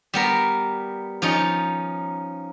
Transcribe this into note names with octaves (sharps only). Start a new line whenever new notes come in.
G3 B3 A#4
F3 C#4 D#4